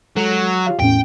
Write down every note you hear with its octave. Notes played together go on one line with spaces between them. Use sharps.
F#3 G#3 A4
F4 G4 F5
E2 A2 C#4 G5